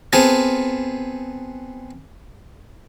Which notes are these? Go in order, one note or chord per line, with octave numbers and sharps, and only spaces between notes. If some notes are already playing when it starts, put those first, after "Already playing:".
B3 C4 F4 G#4 A4